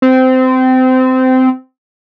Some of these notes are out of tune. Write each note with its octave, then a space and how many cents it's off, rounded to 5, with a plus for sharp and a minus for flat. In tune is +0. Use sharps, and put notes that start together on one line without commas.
C4 -20